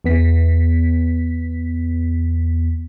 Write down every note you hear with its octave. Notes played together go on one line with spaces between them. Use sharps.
E2 B3 B6